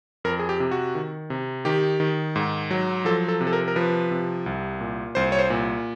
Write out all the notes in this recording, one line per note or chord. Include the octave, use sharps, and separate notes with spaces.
F2 A#4
G#4
G4
C3
F#4
D#3
C3
D#3 G4
D#3
G#2
F#3
F3 A4
A4
C3
A4
A#4
A#4
F3 B4
C3
C2
A#2
C2 C5
C#5
C5
A#2